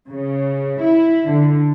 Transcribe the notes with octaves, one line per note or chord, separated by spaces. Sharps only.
C#3
E4
D3